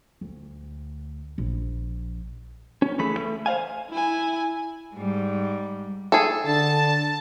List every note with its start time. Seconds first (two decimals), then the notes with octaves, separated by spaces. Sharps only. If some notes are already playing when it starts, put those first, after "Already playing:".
0.21 D2
1.38 A#1
2.82 C#4
2.99 C#2 E3 A3 G#4 B5
3.17 A3
3.46 C5 D5 F5 G#5
3.90 E4 G#5
4.95 G#2 G3
6.12 G#4 A4
6.46 D3 A5